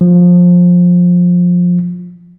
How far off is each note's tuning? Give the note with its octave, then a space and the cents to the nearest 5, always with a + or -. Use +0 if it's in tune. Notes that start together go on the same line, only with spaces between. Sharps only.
F3 +20